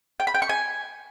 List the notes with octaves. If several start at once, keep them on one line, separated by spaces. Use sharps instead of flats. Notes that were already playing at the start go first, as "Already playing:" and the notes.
G5
B5
G5
C#6
G#5